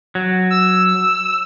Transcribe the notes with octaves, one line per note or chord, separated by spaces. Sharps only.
F#3
E6